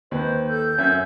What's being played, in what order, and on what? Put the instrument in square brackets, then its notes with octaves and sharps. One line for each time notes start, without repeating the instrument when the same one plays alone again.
[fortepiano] D#2 B4 [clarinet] C5
[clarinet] A4 [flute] G6
[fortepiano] F#2 [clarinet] E5